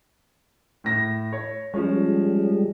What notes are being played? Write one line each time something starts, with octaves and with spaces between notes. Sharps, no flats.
A2 A#6
C#5
F3 G3 G#3 C#4